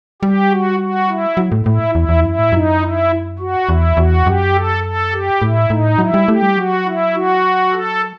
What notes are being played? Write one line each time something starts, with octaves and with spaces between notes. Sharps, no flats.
G3 G4
F#4
F#4
E4
F#3
A2
A2 E4
E2 E4
E2
F#2 E4
A2
F#2 D#4
E4
F#4
E2 E4
E2 F#4
F#2 G4
A4
A4
G4
A2 E4
A2 D#4
F#3 E4
G3
A3 G4
G3
F#3 F#4
E4
F#4
A4